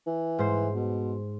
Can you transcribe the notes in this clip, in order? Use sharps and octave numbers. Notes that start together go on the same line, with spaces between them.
E3
G#2 C5
B2